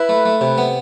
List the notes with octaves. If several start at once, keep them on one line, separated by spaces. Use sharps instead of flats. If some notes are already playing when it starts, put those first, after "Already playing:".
Already playing: E4 B4
A3
A3
C3
B3